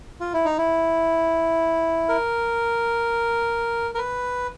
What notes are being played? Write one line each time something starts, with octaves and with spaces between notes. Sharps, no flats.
F4
E4
D#4
E4
A#4
A#4
B4